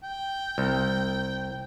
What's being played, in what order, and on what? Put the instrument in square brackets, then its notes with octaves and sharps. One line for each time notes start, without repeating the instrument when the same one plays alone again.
[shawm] G5
[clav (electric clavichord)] C2